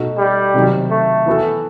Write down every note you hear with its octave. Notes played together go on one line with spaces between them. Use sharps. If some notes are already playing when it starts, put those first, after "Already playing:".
Already playing: B2 A3 D#4 F#4
G3
C3 D#3 F#3
A3
E3 B3 F#4 A4